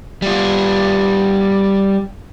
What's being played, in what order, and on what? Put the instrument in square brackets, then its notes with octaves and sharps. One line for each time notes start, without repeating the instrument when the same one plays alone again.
[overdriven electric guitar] G3 F4